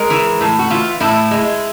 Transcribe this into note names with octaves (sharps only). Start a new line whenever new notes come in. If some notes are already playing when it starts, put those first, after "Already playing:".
Already playing: G#3 A#4
E3
A2
F#4
E3 F4
A2 E4
G#3